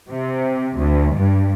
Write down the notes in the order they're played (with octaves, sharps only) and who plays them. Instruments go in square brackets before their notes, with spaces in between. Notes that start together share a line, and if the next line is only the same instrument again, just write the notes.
[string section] C3
D2
G2